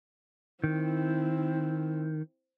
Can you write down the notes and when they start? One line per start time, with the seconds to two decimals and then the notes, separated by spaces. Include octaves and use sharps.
0.64 D#3 C4 E4